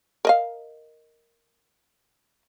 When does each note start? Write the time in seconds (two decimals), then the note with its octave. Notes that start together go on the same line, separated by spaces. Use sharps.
0.25 A#4 D#5 F5